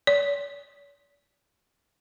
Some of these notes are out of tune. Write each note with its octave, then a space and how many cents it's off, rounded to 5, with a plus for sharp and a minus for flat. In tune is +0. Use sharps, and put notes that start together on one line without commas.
C#5 +45